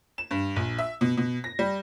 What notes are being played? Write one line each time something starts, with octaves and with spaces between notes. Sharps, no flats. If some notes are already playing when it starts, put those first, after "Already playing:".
E7
G2
A#1
E5
B2
B2
A#6
G3